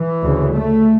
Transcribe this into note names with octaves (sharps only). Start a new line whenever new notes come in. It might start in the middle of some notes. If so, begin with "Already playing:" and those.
Already playing: E3
D2 C#3
A3